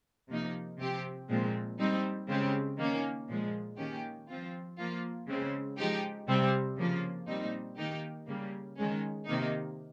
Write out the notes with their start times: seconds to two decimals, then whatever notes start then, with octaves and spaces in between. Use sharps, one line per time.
0.30 C3 F3 A#3 D#4
0.79 C3 F3 C4 G4
1.29 A#2 F3 G#3 C4
1.79 G3 C4 D#4
2.29 C#3 G#3 C4 G4
2.78 D#3 A#3 C#4
3.28 A#2 F3 G#3
3.78 D#3 A#3 C#4 G4
4.29 F3 C4 F4
4.78 F3 A#3 F4
5.28 C#3 G#3 C4
5.78 F3 G#3 D#4 G4
6.27 C3 G3 C4
6.77 C#3 F3 A#3 F4
7.27 A#2 G3 C4 D#4
7.77 D#3 A#3 D#4 G4
8.27 C#3 G3 A#3
8.77 D#3 G#3 C#4
9.26 C3 D#3 A#3 D#4